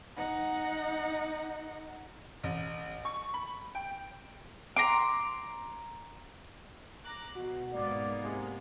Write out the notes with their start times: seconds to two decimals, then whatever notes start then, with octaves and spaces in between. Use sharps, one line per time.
0.17 D#4 F#5
2.43 A1
3.05 C#6
3.34 B5
3.75 G5
4.76 A#5 C6 D6
7.03 A#5 D6 F#6
7.36 B2 F#4
7.73 G#2 A#3 B3 D5
8.23 C3 G#3